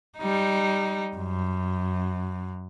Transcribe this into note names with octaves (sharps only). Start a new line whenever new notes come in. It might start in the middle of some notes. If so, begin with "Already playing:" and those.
G3 D#4
F#2